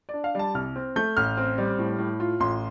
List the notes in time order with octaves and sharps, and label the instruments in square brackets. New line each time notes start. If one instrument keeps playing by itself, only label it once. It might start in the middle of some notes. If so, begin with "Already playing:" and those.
[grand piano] D4 D5
F5
G3 A5
C2 F6
C4
A3 G6
A1 F6
C4
G3
A2
A2
F4
A1 C6